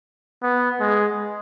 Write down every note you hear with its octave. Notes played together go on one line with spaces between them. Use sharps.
B3
G#3